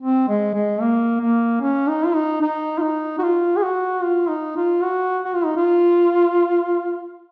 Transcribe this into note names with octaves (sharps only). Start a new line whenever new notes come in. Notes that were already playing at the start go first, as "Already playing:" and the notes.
C4
G#3
G#3
A#3
A#3
C#4
D#4
F4
D#4
D#4
F4
D#4
F#4
F4
G#4
F#4
F4
D#4
F4
F#4
F#4
F4
D#4
F4